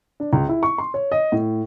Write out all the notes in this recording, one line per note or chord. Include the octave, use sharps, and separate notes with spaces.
D4
C#2
E4
C#6
C6
C#5
D#5
A2